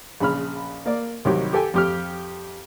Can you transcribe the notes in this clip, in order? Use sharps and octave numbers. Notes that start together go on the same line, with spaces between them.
A#1 C#3 B5 F6
A#3 D5
C2 D#3 F#3 G4
G4 A4 G5 G#5
F2 G4 F6